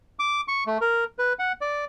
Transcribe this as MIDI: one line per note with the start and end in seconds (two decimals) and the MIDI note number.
0.19 0.41 86
0.48 0.64 85
0.67 0.78 57
0.81 1.04 70
1.19 1.33 71
1.39 1.53 78
1.61 1.85 74